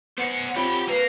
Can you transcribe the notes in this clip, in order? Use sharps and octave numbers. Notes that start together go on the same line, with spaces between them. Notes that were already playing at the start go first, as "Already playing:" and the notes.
B3 C5 F#5
C4 F4 G4 C#5 F#5 B5
A#3 B4 F5